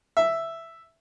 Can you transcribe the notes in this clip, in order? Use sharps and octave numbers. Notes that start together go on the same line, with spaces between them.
E5